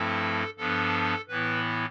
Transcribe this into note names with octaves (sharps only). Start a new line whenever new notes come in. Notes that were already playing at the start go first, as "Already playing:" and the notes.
Already playing: G2 F3 A3 C4 E4 A4
G2 F3 B3 D4 A4
A2 E3 B3 E4 B4